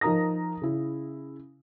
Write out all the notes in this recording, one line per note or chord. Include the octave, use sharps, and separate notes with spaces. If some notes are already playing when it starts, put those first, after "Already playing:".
F3 D#4 A#4 A#5 D#6 A#6
C#3 E4